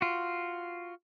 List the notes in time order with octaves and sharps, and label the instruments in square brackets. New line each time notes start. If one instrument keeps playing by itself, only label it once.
[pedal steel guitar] F4 F#4